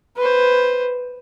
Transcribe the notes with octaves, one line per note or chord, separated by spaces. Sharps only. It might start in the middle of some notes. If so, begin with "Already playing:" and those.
B4 C5